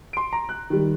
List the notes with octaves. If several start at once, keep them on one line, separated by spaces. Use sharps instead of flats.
C6 D7
A#5
F#6
D#3 G3